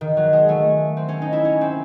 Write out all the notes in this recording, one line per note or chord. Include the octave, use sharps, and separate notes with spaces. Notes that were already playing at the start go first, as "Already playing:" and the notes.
D#3
F#3
G#3
A3
C4
C#4
D#4
E4
C#4
C4